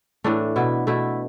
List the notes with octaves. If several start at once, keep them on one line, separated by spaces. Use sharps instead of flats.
A2 E3 A3 D4
B2 B3 E4
B2 A3 E4